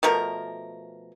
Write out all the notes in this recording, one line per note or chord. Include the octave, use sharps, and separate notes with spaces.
B2 F3 A3 A#4